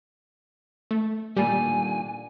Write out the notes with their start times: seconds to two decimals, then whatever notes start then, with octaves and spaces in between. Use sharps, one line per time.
0.91 A3
1.37 A#2 D3 D#3 G3 G#5